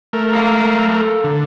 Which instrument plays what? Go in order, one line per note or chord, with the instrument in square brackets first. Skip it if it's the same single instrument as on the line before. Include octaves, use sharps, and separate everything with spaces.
[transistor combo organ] A3 A#4
[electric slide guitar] A4 F5 A#5
[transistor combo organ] D3